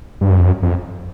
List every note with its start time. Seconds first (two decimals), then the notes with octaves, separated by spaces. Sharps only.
0.21 G2
0.30 F#2
0.39 F2
0.47 F#2
0.62 F2